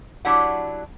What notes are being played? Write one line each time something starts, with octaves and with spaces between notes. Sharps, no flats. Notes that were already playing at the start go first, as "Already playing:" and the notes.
F#3 D4 E4 G4 F#5